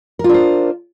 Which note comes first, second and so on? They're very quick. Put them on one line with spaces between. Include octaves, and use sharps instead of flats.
A#4 F4 D4 C5